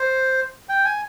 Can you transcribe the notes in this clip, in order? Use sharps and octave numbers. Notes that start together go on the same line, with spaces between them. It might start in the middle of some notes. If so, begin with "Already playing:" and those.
Already playing: C5
G5
G#5